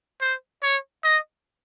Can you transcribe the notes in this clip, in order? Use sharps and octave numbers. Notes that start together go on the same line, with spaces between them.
C5
C#5
D#5